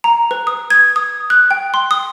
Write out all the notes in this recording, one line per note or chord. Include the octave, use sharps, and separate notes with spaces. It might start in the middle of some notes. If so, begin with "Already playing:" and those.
A#5
B4
D#6
G#6
D#6
F#6
G5
C6
D#6